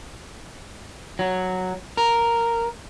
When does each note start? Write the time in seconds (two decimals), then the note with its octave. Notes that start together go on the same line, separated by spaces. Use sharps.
1.19 F#3
1.97 A#4